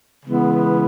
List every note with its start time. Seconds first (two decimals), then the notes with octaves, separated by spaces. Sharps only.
0.25 C#3 E3 G#3 B3 E4